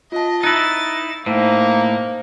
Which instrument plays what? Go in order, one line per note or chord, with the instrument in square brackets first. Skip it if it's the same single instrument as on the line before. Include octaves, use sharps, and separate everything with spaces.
[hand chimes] F4 A5 [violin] D#5
[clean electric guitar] D#4 E4 [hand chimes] F#6 [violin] A6
[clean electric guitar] A2 [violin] A#3 D#4 [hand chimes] C5